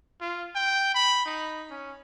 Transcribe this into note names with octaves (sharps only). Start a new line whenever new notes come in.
F4
G5
B5
D#4
C#4